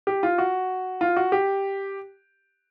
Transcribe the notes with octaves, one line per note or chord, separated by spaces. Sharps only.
G4
F4
F#4
F4
F#4
G4